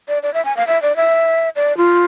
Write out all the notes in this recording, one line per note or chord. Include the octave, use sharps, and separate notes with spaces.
D5
D5
E5
G#5
F5
E5
D5
E5
D5
F4